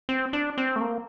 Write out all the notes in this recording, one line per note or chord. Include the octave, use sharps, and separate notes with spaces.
C4
D4
C4
A3
A#3